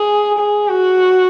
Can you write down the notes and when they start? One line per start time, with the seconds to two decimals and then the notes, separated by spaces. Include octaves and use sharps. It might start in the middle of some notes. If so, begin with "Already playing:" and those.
Already playing: G#4
0.38 G#4
0.68 F#4